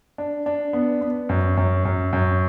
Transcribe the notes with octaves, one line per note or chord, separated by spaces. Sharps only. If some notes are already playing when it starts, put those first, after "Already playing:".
D4
D4
B3
B3
F#2
F#2
F#2
F#2